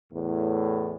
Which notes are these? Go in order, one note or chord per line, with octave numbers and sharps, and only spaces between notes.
E2 A2